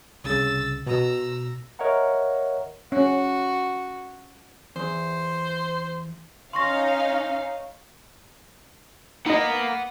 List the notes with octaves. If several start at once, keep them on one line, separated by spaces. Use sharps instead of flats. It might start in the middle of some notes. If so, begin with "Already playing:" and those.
C2 C#3 E6 A6
B2 A#5 E6
A#4 C#5 D#5 E5 F#5 A#5
C#4 F#4
E2 C5
C#4 D#4 F5 C6 C#6 A#6
A#3 D#4 D#5 F#5 B5